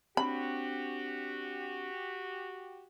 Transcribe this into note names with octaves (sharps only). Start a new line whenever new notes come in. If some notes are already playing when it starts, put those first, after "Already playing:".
C4 D4 F#4 G4 B5